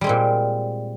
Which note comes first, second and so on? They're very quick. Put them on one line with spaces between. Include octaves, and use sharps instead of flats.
G3 G#3 C4 A#2